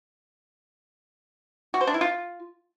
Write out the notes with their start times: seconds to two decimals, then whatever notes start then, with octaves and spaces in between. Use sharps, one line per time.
1.74 F#4
1.81 C5
1.87 D4
1.94 E4
2.01 F4